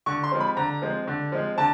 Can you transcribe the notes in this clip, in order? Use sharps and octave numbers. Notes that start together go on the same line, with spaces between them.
D3 C#6
C6
F3 G#3 C4
B5
D3 A#5
F3 G#3 C4
D3
F3 G#3 C4
D3 A5